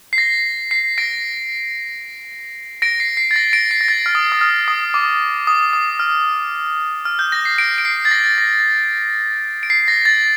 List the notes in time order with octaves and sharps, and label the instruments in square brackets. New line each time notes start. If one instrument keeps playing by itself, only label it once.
[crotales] C7
A#6
C7
A#6 D7
A#6 D7
C7
C7
A6
A#6
A#6 D7
C7
A#6
A6
F6
D#6
D#6
F6
D#6
D6
D#6
D#6
F6
F6
G6
A#6
C7
A#6 D7
D7
C7
A6
A#6
A#6
D7
C7
A#6
A6